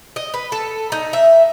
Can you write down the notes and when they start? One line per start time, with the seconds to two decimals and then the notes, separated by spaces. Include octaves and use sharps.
0.16 D#5
0.34 B4
0.52 A4
0.92 D#4
1.13 E5